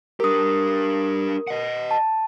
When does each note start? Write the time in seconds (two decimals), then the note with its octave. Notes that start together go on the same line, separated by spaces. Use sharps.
0.20 D4 G4 A#4 D#6
1.47 D#5 F#5
1.91 A5